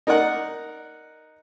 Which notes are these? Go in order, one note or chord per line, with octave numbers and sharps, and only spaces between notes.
D#4 A#4 D5 F#5